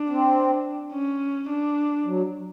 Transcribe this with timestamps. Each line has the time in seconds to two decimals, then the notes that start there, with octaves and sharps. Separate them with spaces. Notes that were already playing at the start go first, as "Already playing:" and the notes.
Already playing: D4
0.09 C4
0.94 C#4
1.49 D4
2.05 F#3